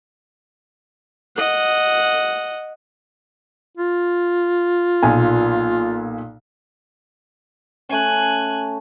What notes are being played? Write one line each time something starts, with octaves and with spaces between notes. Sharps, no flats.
D#5 F#5
F4
B1 A#2 G#5
A3 C#4 G#5 F#6